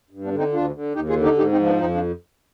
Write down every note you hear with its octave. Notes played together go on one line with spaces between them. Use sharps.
G2
B3 D4
D3
C4 D#4
D2 D4 F4
D3
D#2 D#4 G4
F4 G#4
D3
D#4 G4
G#2 D#4 G4
C4 D#4
F3
B3 D4
F2 C4 D#4
D4 F4